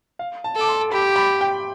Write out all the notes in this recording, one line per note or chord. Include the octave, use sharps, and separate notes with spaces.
F5
A5
A4 D6
C6
G4 B5
B5
G5